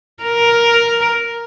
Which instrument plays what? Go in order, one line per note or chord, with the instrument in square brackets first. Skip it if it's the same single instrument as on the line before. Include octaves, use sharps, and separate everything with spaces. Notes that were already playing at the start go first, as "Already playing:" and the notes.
[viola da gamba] A#4